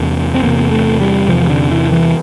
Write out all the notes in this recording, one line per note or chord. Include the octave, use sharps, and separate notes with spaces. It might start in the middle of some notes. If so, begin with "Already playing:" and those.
Already playing: E2 C3 A#3
C4
E2 C3 A#3
A3
G3
E2 C3 F3
D3
E3
E3